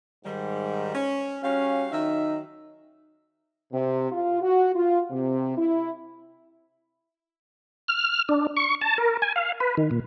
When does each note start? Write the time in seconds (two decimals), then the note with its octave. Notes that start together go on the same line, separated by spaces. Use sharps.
0.25 G#2 D#3 G3
0.94 C#4
1.43 G3 C#4 F#4 F5
1.92 D#3 F#3 D#4 E5
3.72 C3
4.12 F4
4.42 F#4
4.74 F4
5.10 C3
5.57 E4
7.88 F6
8.29 D4
8.57 C#6
8.81 A5
8.98 A#4
9.22 G#5
9.36 F5
9.60 B4
9.77 D#3
9.91 A#2